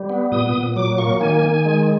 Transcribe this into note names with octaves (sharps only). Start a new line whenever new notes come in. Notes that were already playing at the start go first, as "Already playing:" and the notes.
Already playing: G3
B3
A#2 D#6
A#2
F#3 D6
A#3 C#6
D#3 G#5
D#3
G#3